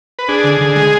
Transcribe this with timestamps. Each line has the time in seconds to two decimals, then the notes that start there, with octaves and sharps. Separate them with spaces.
0.19 B4
0.28 D4 G#4
0.44 D3
0.61 D3
0.76 G#3